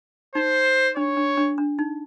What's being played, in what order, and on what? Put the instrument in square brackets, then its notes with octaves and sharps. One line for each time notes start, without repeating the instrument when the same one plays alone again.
[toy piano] D#4 [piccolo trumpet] C5
[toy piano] D4 [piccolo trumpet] C#5
[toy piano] D4
D4
D4
D#4